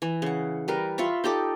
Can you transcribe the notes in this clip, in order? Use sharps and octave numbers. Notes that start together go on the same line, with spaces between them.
E3
C#3 F#5
G3 A#4 B4
F4 E5 B5 C#6
D#4 G4 A4 D5